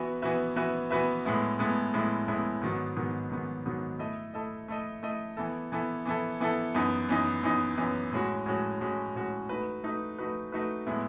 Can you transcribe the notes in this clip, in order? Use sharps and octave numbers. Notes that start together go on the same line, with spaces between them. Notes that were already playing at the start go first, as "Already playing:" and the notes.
Already playing: E3 B3 F#4 B4 E5
E3 B3 F#4 B4 E5
E3 B3 F#4 B4 E5
E3 B3 F#4 B4 E5
A2 G#3 B3 E4
A2 G#3 B3 E4
A2 G#3 B3 E4
A2 G#3 B3 E4
G#2 D#3 F#3 B3
G#2 D#3 F#3 B3
G#2 D#3 F#3 B3
G#2 D#3 F#3 B3
A3 E4 A4 D#5
A3 E4 A4 D#5
A3 E4 A4 D#5
A3 E4 A4 D#5
E3 B3 E4 A4
E3 B3 E4 A4
E3 B3 E4 A4
E3 B3 E4 A4
F#2 E3 B3 D#4
F#2 E3 B3 D#4
F#2 E3 B3 D#4
F#2 E3 B3 D#4
A2 G#3 C#4 F#4
A2 G#3 C#4 F#4
A2 G#3 C#4 F#4
A2 G#3 C#4 F#4
A3 D#4 F#4 B4
A3 D#4 F#4 B4
A3 D#4 F#4 B4
A3 D#4 F#4 B4
A2 G#3 B3 E4